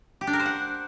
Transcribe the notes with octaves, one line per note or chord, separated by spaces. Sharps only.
G4
D4
A#4
C5
F#5